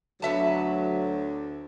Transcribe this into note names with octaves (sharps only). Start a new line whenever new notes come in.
D2 F#3 B3 E5 A5